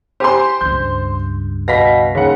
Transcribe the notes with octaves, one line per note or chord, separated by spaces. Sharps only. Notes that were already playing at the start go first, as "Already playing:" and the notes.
G4 C5 G#5 C6
C#2 G2 G6
B2 F5 A#6 B6
D#2 C#3 F#5